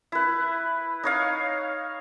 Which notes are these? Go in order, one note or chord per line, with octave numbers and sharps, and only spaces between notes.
E4 B4
D#4 C#5 F5